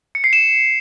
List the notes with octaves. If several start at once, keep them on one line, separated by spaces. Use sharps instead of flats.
C#7
C7
E7